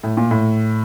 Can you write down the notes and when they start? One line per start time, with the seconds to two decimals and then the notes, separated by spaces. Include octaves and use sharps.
0.03 A2
0.17 A#2
0.31 A2